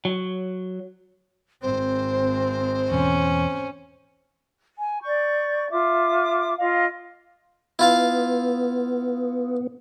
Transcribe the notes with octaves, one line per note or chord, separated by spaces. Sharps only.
F#3
G#1 C4 C5
E2 B2 E3 C#4
G#5
D5 C#6 G6
F4 E5 D6
F4 D#5 F5
B3 E4 F4 F5